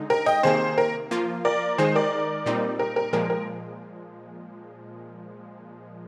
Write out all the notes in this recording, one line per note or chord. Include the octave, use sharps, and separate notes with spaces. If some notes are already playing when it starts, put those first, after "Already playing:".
Already playing: D3 G#3 D#4
A#4
D#5 G5
C3 D#3 A#3 G#4 C5
A#4
F3 A#3 F4
A#4 D5
D#3 G#3 D#4 G#4 C5
A#4 D5
A#2 G3 C4 D#4
A#4
A#4
A#2 F3 G#3 A#4
A#4